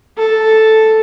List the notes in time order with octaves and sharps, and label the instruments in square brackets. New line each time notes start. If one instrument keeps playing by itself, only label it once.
[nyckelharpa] A4